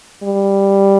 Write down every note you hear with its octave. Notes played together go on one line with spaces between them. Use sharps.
G3